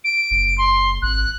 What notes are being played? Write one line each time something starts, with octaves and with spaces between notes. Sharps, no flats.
D7
F#1
C6
G#1 F#6